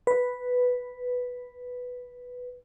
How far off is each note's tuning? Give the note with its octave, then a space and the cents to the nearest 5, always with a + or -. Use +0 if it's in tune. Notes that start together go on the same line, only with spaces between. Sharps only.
B4 +0